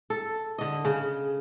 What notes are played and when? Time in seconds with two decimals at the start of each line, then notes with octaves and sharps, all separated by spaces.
0.10 A4
0.58 D3 D#5
0.85 C#3